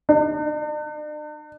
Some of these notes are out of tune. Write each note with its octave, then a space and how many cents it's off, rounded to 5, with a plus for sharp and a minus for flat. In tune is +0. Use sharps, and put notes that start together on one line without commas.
D4 +45